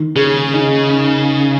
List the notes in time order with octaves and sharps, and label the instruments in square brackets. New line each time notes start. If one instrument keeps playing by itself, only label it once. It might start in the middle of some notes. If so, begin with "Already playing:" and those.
Already playing: [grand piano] D#3
[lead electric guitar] C#3 [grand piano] G#4
[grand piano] D#4